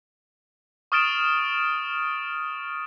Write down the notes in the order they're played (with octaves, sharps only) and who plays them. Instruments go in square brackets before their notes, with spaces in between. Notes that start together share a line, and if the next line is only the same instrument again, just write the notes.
[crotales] C#6 D#6 F6 A6 D7 E7